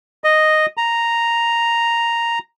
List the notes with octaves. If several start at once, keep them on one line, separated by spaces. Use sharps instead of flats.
D#5
A#5